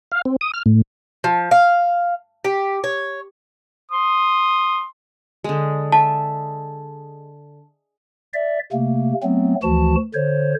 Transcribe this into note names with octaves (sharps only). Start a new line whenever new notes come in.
F5
C4
D#6
F6
A2
F3
F5
G4
C#5
C6 D#6
D3 G#3
E5 A5
D5 E5
C3 A3 A#3
F#3 A3 B3 C4
D2 E3 F3 F#4 A5
D3 C5 C#5